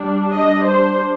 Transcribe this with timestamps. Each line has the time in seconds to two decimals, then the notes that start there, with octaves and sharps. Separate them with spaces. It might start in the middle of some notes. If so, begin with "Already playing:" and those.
Already playing: G3 D4
0.33 D#5
0.67 C5